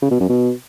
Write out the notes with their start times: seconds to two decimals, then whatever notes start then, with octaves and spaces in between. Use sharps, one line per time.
0.02 C#3
0.11 B2
0.20 F#2
0.29 B2